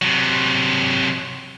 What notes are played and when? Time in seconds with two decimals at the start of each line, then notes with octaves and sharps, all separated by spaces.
0.02 C3 F#3